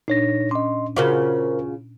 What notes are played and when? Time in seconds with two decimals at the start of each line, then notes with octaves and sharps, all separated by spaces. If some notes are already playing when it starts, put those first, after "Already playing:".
0.08 A#2 D4 D#4 C#5 A#6
0.51 C#4 D#5 C6 D6
0.96 C#3 F4 F#4 A#4 C5 D6